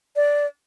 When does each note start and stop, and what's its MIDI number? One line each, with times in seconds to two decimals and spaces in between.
0.16 0.46 74